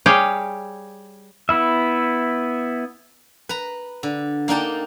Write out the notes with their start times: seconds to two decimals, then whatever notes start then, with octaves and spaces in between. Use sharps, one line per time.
0.06 G3 G4 G#4 C#5 F5 G5
1.49 B3 E4 E5
3.49 B4 A#5
4.03 D3
4.48 A#3 D4 D#4 G5 A5